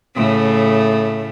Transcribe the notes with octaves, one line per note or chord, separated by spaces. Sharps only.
A2 C#3 A3